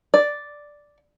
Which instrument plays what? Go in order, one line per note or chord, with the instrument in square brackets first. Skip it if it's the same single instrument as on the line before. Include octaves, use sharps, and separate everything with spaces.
[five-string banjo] D5